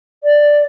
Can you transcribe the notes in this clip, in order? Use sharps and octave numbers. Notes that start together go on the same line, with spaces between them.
D5